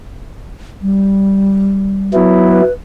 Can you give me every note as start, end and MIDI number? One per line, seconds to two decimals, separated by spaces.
0.82 2.12 55
2.14 2.62 54
2.14 2.62 59
2.14 2.62 64
2.49 2.72 71